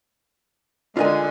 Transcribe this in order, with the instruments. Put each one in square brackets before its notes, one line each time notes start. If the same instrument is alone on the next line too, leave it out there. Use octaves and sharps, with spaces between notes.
[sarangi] D3 [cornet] G#3 [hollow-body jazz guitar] F4 A#4 G#5